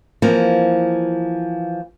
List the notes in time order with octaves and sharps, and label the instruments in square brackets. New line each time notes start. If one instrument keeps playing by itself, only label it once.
[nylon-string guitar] E3 F3 A#3 C4